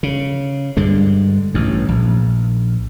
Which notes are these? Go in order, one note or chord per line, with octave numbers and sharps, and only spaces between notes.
C#3
G2 D3 G#3
A1 G2
A#1